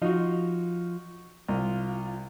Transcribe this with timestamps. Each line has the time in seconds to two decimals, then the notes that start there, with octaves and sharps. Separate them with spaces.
0.02 F3 D#4 F4 F#4
1.49 C2 F4